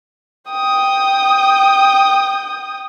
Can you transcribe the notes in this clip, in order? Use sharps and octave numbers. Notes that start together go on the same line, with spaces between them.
G5 D#6